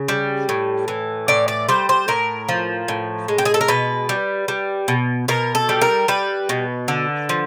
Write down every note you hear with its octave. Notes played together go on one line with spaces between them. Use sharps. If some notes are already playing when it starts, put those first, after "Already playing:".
Already playing: C#3
G3
A2
E3
A2 D5
D5
G3 C5
C5
A2 A#4
F3
A2
G#3
G4
G#4
A4
A#4
B2 B4
G3
G3
B2
B2 A#4
A4
G3
A#4
G3 B4
B2
D3
F3